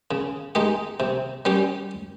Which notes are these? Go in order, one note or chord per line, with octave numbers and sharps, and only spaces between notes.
C#3
G#3 D#4 G4
C3
G3 C#4 G4